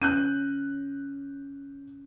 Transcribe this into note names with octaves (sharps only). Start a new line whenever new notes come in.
C#4 F#6 G6 D#7